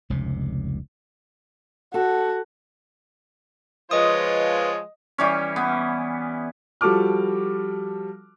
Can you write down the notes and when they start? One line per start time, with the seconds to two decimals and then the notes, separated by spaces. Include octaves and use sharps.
0.10 F1 C#2 C3
1.94 F#4 A4
3.91 F3 G#3 F4 B4 C#5 D#5 D#6
5.18 E3 G3 C#4
5.56 B3
6.81 F3 G3 F#4 A4 D6 F6